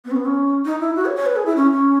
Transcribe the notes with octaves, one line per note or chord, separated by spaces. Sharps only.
B3
C#4
B3
C#4
D#4
E4
F#4
C#5
C#5
B4
G#4
E4
C#4
C#4